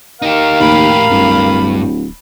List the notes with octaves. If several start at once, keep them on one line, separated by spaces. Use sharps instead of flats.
D#4 G4 A#4 F5
D#2 A2 G4 B5
D1 G2